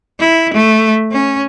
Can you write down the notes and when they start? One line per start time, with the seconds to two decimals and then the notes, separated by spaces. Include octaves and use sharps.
0.20 E4
0.54 A3
1.12 C#4